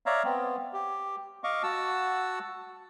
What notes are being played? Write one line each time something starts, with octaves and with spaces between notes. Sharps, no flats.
C#5 D5 E5 F5 A#5
B3 C4
G4
D#5 F5 C#6 D6
F#4 F#5 A5 E6